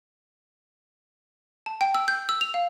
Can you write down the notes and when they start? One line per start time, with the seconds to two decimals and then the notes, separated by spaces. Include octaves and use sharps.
1.66 A5
1.81 G5
1.95 E6
2.08 G6
2.29 E6
2.41 F7
2.54 F5